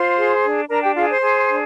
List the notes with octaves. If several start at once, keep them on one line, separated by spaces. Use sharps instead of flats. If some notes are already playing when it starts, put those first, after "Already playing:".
Already playing: F4 C5 C6
G#4
D4
D4 A#4 A#5
G4 G5
F4 G#4 F5
C5 C6
G#4
D4